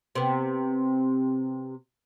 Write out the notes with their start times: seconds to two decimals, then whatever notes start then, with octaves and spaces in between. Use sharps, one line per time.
0.15 C3 B3